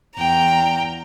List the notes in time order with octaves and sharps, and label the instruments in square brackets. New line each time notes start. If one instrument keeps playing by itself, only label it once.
[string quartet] E2 G5 A#5